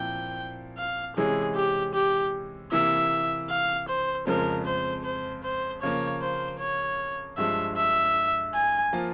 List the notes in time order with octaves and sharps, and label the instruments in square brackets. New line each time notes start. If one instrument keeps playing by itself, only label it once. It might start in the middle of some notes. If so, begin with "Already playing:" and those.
Already playing: [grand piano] A#2 F3 C4 E4 [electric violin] G5
[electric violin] F5
[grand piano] C3 E3 G#3 C#4 E4 [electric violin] G#4
[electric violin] G4
G4
[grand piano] C3 E3 A#3 E4 [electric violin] E5
[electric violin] F5
C5
[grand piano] F2 C#3 F3 G#3 C4 [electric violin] A#4
[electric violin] C5
C5
C5
[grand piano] C#3 F3 A#3 [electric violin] C#5
[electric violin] C5
C#5
[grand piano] G2 F3 G#3 [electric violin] E5
[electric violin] E5
G#5
[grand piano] F3 A#3 F4